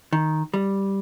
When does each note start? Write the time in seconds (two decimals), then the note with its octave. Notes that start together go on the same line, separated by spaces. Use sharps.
0.13 D#3
0.54 G3